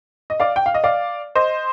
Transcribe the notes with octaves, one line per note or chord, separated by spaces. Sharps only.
D#5
D5 F5
G5
F5
D#5
D5 F5
C5 D#5